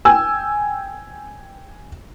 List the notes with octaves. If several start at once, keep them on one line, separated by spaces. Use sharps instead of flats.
G5 G#5 E6